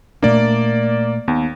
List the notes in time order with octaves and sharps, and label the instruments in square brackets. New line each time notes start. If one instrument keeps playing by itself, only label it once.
[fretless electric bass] A#2 A3 D4 [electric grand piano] A#3 D5
[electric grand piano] D#2 [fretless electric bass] B3